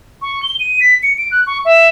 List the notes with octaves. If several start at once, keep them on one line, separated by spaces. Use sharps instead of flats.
C#6
G7
D#7
B6
C#7
D7
F#6
C#6
E5